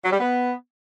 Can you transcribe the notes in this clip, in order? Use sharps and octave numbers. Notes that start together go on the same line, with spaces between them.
F#3
G3
B3